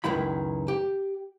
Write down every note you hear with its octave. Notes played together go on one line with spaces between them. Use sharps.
C#2 F#2 D#3 E4 B5
G4